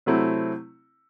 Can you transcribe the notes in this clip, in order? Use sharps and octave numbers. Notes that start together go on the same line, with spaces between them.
C3 F#3 A3 C4 E4